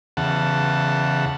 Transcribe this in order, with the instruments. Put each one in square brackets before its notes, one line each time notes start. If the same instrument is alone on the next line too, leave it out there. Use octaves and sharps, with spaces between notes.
[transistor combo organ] E2 C#3 F#5 A5